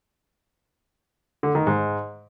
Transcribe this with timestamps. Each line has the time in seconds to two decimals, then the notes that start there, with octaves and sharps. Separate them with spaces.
1.43 D3
1.55 D#3
1.67 G#2